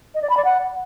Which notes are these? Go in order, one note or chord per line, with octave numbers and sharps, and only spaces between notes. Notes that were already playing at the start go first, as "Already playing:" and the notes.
D#5
D5
B5
D5
F#5